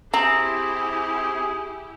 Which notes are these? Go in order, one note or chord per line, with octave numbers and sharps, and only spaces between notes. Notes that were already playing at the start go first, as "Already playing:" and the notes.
C4 E4 G4 G#4 A#5